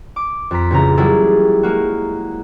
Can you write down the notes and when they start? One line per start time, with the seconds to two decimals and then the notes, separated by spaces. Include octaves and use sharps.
0.16 D6
0.51 F2 A#5 B6
0.71 A1 C#3 A#5
0.97 F#3 G3 A#3 E4 G#4 A4
1.63 G#3 A#3 F#4